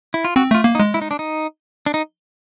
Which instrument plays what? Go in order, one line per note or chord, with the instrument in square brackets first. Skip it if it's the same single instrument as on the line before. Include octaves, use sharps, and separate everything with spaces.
[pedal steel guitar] E4
F4
[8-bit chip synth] C4 [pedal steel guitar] F#4
[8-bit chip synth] A3 [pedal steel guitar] F4
[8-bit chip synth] A#3
[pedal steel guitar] D#4
[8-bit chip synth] G#3
[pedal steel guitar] E4
D#4
D4
D#4
D4
D#4